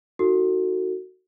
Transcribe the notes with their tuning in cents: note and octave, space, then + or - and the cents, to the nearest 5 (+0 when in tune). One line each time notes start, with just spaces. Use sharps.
D#4 +25 F#4 +0 A4 +35